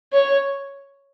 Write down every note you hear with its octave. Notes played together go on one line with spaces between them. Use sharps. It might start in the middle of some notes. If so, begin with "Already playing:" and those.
C#5